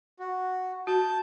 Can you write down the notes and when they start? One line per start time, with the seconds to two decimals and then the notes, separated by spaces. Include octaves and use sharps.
0.19 F#4
0.87 F#4 A5 G6